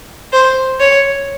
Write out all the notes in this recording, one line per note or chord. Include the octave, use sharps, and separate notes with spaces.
C5
C#5